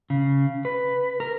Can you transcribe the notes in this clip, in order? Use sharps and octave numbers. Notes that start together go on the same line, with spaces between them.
C#3
B4
A#4